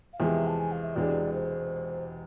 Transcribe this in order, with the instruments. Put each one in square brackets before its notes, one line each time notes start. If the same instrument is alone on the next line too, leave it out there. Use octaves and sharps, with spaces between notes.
[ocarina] F5
[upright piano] E2 C3 F3 G#3 [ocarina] E5
[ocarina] A5
G#5
F5
E5
[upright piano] E1 E2 C3 G#3 D4 [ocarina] D5
[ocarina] C5